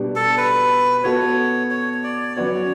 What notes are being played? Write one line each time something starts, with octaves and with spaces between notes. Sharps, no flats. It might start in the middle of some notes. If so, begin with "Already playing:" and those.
Already playing: B2 G3 B3 D4 G4
A4
B4
B3 F#4 A4 C#5
C#5
C#5
D5
F#3 C#4 F#4 B4 C#5 D5